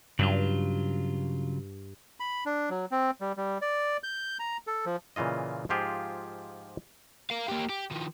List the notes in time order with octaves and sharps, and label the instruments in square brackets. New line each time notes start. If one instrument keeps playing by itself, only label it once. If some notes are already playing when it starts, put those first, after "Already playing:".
[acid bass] G2 [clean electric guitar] C#3 F#3 F4
[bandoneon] B5
D4
F#3
C4
G3
G3
D5
G6
A#5
A4
F3
[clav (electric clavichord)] A#2 C#3 E3 F4 D#5
G#2 F3 F4 G4 G#4
[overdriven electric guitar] A#4 F5
A#3 G4
G4
D#3 F3